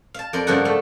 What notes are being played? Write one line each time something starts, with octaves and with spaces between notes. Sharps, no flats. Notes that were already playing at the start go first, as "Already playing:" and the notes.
F5 A5
F2 A#4 D5 C6
G2 C#3 F3 A#3 D4 F#5
A3